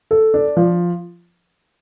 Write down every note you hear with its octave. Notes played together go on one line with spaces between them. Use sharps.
A4
D4
F3